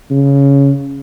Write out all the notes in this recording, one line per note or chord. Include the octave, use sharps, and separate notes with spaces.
C#3